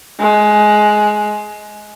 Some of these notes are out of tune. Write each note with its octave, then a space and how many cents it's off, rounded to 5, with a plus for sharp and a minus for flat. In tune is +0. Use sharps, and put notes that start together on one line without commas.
G#3 +15